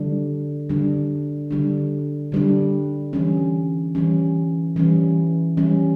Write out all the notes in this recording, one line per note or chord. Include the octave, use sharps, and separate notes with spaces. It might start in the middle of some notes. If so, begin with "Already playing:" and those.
Already playing: D3 G3 D4
D3 G3 D4
D3 G3 D4
D3 G3 D4
E3 G3 C#4
E3 G3 C#4
E3 G3 C#4
E3 G3 C#4